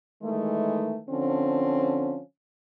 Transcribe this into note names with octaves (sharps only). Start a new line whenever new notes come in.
D#3 E3 G#3 A3
D3 F3 C4 C#4